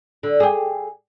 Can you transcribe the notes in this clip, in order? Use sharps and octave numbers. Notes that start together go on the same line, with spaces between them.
D3
G4 G#4